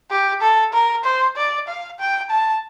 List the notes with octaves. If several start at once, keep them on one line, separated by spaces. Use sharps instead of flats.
G4
A4
A#4
C5
D5
F5
G5
A5